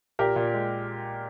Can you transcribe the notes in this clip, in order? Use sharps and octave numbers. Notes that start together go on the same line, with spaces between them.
A#2 G4 A#4
A#2
G#3